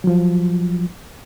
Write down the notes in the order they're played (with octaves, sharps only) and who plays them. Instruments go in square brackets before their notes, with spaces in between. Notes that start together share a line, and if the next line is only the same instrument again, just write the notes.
[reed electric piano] F3 F#3